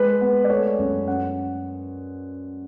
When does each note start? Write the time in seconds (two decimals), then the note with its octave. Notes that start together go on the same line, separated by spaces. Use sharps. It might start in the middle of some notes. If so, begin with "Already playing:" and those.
Already playing: G#3 B4
0.21 B3
0.44 D5
0.50 A3 C#5
0.78 F#2
1.08 C#4 F#5